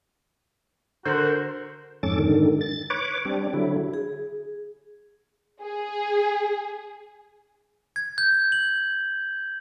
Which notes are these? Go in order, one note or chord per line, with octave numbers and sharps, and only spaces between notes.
D3 F#4 A#4 C5
F2 G#2 C#4 A4 D6 A6
G#2 D3 D#3
A6
B4 C#5 D6
G3 C4 D4
D3 F#3 E4
G#4
G#4
G#6
G6
F#7